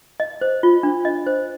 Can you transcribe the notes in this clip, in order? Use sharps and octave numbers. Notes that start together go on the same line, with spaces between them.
D#5
C5
F4
D4
D#5
C5